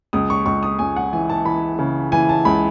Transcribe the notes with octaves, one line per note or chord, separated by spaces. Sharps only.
C#2 D#6
C#6
C#2 C#6
D#6
C#2 G#5
F#5
E3 G#5
A5
E3 B5
C#3
E3 G#5
A5
C#2 B5